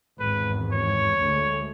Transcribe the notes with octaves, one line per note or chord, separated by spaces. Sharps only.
G#1 E2 G2 B4
C#5
D2 G#3 A3